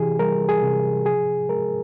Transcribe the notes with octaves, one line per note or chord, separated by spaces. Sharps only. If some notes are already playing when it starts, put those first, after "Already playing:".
Already playing: C3 E3 G4 G#4
G3 A#4
G#4
C3
F3 G#4
G#3 A#4